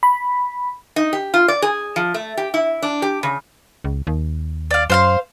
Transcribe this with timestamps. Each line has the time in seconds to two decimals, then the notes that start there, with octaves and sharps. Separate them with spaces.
0.03 B5
0.96 D#4
1.13 G4
1.34 F4
1.48 D5
1.62 G#4
1.96 F3
2.14 A3
2.37 G4
2.54 E4
2.82 D4
3.02 G4
3.23 C#3
3.84 C#2
4.07 D#2
4.71 D5 F5
4.90 F#2 C5 F5 C6